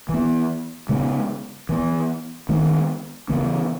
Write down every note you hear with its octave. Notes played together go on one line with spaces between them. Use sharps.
E3 B3
C#3 G#3 B3
E3 B3
D#3 G#3 B3
C#3 E3 B3